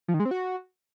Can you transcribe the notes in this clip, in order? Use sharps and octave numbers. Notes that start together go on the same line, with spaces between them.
F3
D#3
G#3
C4
F#4